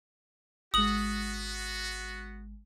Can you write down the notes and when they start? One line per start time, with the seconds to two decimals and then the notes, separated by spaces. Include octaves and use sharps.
0.74 G#1 G#3 B3 F#4 D#6 F#7